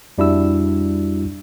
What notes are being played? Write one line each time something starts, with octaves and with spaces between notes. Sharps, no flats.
F2 G3 D4 E4 F#4 E6